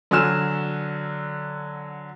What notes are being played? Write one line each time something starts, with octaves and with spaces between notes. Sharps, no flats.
D3 F#3 G#5 E6 F6 E7